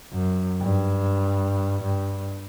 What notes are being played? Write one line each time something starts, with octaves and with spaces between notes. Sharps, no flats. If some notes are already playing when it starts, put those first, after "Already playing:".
F#2
G2
G2